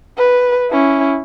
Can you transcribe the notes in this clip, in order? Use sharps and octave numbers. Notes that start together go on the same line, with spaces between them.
B4
C#4 E4